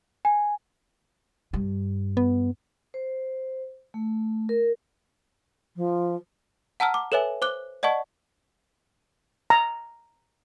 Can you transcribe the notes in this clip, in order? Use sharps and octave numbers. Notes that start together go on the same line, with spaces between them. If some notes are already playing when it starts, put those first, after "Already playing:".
G#5
G2
B3
C5
A3
A#4
F3
F#5 A5 A#5 E6 F6
D6
A4 B4 C#5 E5 G#5
C5 D6 F#6 G7
D5 D#5 F#5 A5 C#6
A#5